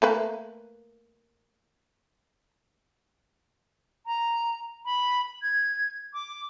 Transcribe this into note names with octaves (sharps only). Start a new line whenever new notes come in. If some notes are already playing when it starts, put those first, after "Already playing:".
A3 A#3 B4
A#5
B5
G#6
D6